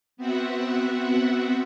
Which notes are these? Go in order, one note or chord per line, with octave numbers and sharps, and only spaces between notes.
B3 C4 F#4 E5 F#5